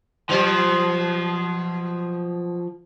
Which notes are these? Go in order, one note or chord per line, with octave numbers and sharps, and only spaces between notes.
B2 F3 F#3 C5